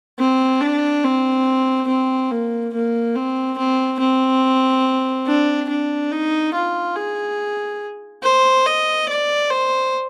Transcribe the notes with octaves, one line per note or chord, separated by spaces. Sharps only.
C4
D4
C4
C4
A#3
A#3
C4
C4
C4
D4
D4
D#4
F4
G#4
C5
D#5
D5
C5